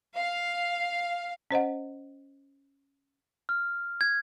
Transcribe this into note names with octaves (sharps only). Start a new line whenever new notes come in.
F5
C#4 C5 D#5 F#5
F6
G#6